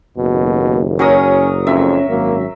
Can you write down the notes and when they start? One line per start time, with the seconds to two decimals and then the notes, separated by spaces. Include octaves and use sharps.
0.17 F#1 D#2 B2
0.99 F#3 C#4 A#4 D#6
1.67 F2 C#4 E5
2.09 G#1 F#2 A#3